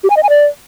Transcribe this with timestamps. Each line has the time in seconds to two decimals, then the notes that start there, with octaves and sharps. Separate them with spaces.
0.04 G4
0.10 G#5
0.17 D#5
0.23 G#5
0.30 D5